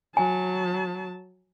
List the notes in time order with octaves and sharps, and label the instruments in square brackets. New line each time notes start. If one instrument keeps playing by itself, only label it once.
[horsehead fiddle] F#3 A5 [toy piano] G#5